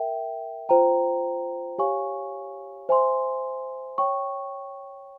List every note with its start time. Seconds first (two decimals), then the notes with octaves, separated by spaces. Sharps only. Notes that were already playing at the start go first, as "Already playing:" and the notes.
Already playing: A#4 E5 G5
0.69 F4 C5 G5 A#5
1.78 G4 C#5 F5 G#5 C#6
2.89 C5 E5 G#5 C6
3.98 C#5 G5 C#6